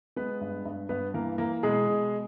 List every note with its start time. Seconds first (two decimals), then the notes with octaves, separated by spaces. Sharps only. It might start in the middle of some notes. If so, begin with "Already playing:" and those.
0.16 G#3 B3 B4
0.41 G2
0.65 G2
0.89 G2 B3 B4
1.14 E3 A#3 A#4
1.38 E3 A#3 A#4
1.63 B2 G#3 G#4
1.88 B2